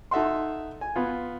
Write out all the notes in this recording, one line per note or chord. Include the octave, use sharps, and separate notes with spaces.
D#4 A4 E5 F#5 C6
G#5
B3 F4